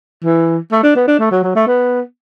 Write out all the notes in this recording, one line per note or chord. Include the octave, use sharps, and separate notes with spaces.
E3
A3
D4
B3
D4
A3
F#3
F#3
A3
B3